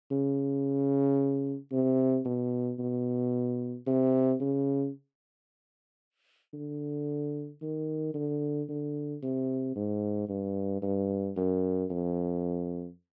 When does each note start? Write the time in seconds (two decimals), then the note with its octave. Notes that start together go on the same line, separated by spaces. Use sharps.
0.12 C#3
1.72 C3
2.25 B2
2.79 B2
3.87 C3
4.40 C#3
6.54 D3
7.62 D#3
8.14 D3
8.69 D3
9.22 C3
9.76 G#2
10.29 G2
10.82 G2
11.36 F#2
11.90 F2